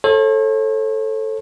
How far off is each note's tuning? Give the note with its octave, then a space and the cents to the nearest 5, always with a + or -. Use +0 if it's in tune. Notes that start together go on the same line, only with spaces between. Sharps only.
A4 +0 C#5 -45